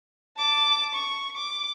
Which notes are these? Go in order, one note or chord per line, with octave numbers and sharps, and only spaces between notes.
A5 D6
C#6
D6